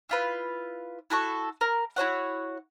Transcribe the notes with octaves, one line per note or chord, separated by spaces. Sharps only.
E4 F4 B4
E4 F#4 A4 C#6
A#4
E4 F#4 C#5 F#5